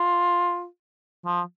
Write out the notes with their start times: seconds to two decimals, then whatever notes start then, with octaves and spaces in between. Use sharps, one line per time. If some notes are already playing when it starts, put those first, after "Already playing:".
Already playing: F4
1.26 F3